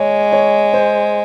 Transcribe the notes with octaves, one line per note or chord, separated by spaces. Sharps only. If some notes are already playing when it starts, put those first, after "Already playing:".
Already playing: G#3 C#5
C#5
C5